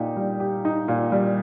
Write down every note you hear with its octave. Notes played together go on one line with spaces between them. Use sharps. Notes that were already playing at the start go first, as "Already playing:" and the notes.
Already playing: A#2 D#4 G4
G3
G4
D#4
A#2
G3